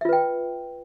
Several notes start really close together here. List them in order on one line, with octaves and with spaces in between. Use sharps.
E5 F4 B4 G5